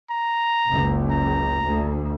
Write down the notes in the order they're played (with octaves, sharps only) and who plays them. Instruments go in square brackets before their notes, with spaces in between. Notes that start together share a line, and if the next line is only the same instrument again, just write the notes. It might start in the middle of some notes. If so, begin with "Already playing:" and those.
[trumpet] A#5
[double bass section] F#1 C#2
[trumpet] A#5
[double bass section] D2